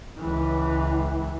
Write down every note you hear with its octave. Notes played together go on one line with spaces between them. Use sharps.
C#2 E3